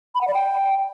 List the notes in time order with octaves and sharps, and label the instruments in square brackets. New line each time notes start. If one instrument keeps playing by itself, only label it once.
[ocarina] B5
F#5
D5
G5